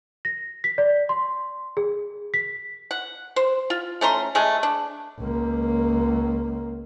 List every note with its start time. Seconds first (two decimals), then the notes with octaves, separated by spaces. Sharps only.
0.25 A#6
0.64 B6
0.78 D5
1.09 C6
1.77 G#4
2.34 B6
2.91 F#5
3.36 C5
3.70 F4
4.01 A3 C#4 A#5 C6
4.35 G#3 A3 G#4
4.63 D4
5.20 C#2 A#3